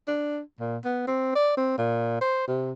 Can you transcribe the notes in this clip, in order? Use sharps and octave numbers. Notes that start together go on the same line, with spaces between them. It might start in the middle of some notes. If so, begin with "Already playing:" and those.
D4
A#2
B3
C4
D5
C4
A#2
C5
C3